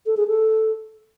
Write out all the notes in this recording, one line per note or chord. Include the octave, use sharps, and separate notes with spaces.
A4
G#4
A4